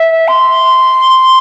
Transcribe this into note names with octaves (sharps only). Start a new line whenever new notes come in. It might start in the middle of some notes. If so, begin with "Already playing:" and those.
Already playing: E5
C6